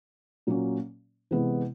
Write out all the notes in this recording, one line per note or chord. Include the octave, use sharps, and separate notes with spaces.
A#2 F#3 A#3 C#4
C3 E3 G#3 B3 E4